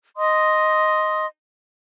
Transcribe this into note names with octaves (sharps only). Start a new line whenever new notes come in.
D#5 C6 D#6